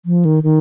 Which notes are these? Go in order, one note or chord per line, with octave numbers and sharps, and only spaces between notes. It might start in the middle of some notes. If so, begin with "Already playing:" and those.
F3
D#3
D#3